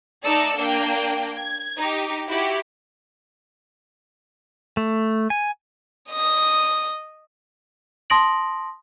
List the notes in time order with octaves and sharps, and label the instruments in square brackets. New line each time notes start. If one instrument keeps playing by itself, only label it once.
[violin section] A3 D#4 A4 D5 E6
A#3 D4 G5
G#6
D#4 G4
E4 F#4 G4
[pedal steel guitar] A3
G#5
[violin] D#5 D#6
[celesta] A5 C6 D#6 A#6 D7 F#7